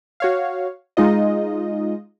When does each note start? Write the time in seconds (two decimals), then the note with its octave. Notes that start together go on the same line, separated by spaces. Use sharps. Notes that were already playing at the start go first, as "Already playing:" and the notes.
0.20 F#4 C#5 F5
0.97 G#3 D#4 F4 D#5